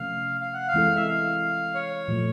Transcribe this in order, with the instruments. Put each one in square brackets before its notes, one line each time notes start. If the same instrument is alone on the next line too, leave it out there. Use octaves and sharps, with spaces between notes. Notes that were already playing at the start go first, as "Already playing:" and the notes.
Already playing: [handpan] C3 F3 A3 C#4 [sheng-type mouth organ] F5
[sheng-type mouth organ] F5
F#5
F5
[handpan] E3 G#3 C4 E4 A4
[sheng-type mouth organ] E5
F5
C#5
[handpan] A#2 F3 A3